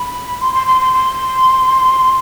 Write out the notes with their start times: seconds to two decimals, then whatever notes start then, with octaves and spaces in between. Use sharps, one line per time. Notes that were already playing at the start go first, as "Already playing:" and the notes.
Already playing: B5
0.40 C6
0.54 C6
0.66 C6
0.80 C6
0.93 C6